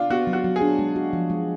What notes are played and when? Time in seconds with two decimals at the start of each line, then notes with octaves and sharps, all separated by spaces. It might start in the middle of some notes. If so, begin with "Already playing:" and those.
Already playing: D4 F4
0.10 B3 F#4
0.27 F#3
0.33 F#4
0.44 F#3
0.56 G#4
0.62 D4
0.79 G#3
0.96 F#4
1.13 F3
1.30 G#3